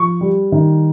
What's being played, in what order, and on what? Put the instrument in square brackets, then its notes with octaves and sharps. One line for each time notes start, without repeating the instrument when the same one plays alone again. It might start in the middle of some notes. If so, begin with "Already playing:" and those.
Already playing: [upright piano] F3 C#6
G3
D#3